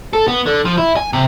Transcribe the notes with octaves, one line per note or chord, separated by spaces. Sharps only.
A4
B3
D3
F3
E4
G#5
C3